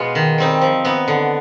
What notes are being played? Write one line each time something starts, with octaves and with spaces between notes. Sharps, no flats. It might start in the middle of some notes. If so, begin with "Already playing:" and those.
Already playing: B2 G#3 B3 F4 G#4
D#3
G3 C4 D#4
F3
B3 D#4
D3